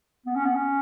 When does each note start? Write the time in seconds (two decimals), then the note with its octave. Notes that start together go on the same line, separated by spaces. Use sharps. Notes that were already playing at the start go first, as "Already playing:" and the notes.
0.26 B3
0.36 C#4
0.45 B3
0.55 C#4